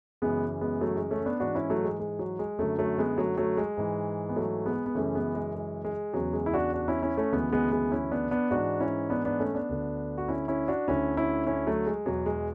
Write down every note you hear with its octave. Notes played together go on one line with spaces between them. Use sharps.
F#2 C#3 E3 G#3 B3
G#3 B3
F#3 A3
G#3
A3 C#4
B3 D4
G#2 E3 D4 F#4
C#4 E4
F#3 A3
G#3
G#3
F#3
G#3
F#2 D3 F#3 A3
F#3 A3
G#3 B3
F#3 A3
F#3 A3
G#3
G#2 E3
B3
F#3 A3
G#3 B3
B3
F#2 C#3 E3 A3 C#4
G#3 B3
G#3
G#3
G#3
E2 C#3 E3 F#3
G#3
E4
D4 F#4
D4 F#4
C#4 E4
C#4 E4
A3 C#4
D2 C#3 E3 G#3 B3
G#3 B3
G#3 B3
C#4 E4
B3 D4
B3 D4
G#2 E3 D4 F#4
C#4 E4
B3 D4
B3 D4
A3 C#4
B3 D4
D2 D3
F#4
C#4 E4
C#4 E4
D4 F#4
D2 D3 C#4 E4
C#4 E4
C#4 E4
F#3 A3
G#3
E2 B2 F#3
G#3